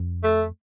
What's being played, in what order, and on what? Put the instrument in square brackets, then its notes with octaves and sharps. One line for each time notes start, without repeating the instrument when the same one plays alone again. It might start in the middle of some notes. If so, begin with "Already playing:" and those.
Already playing: [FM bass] F2
[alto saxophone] A3